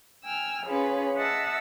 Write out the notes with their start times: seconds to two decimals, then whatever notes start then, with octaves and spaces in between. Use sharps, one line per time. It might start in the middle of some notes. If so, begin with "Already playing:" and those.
0.25 G5 G#5 E6 F6
0.67 C#4 F4 G#4 B4 C#5
1.16 D#5 E5 F#5 A5 E6